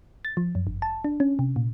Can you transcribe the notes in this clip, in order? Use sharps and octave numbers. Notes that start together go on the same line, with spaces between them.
A6
F3
F#2
G1
A5
D4
C#4
C3
A#2